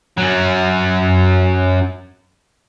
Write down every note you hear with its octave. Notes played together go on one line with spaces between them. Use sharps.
F#2 F#3